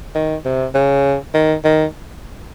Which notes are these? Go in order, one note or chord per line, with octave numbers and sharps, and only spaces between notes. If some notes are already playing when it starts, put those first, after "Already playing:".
D#3
C3
C#3
D#3
D#3